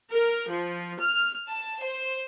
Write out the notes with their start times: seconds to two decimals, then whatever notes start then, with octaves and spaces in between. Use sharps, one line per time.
0.11 A#4
0.49 F3
1.00 F6
1.49 A5
1.82 C5